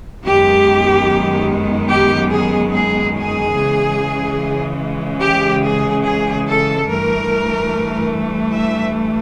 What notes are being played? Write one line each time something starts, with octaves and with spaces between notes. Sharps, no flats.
F#2 D#3 G#3 B3 G4
G4
G#4
G#4
G#4
C#3 E3 G#3
G4
G#4
G#4
A4
G2 E3 A3 A#4
E5